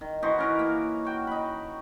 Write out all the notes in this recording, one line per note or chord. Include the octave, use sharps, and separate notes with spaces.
D#3
E3 D#4 F#4 C5
C#4 A#4 B4
A#3
F#4 G5
D#4 B5